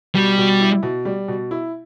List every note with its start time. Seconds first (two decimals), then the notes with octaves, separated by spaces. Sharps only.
0.15 B2 G3
0.38 B2
0.61 E4
0.83 B2
1.05 G3
1.28 B2
1.51 E4